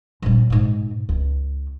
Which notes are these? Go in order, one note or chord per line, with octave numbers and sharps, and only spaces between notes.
A#1 G3
G#2 B2
C#2